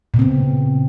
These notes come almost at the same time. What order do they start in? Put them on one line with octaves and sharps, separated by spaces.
A#2 C#3 C4 B3